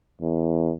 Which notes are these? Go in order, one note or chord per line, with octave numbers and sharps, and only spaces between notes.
E2